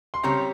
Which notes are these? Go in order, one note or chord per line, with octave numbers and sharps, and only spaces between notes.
C6
C#3 G3 C4 G4 C#5 A#5